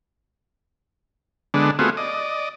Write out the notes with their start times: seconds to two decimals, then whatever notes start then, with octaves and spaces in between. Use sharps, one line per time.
1.54 D3 G#3 B3 D4
1.79 A3 B3 C4 F4 F#4 G#4
1.97 D5 D#5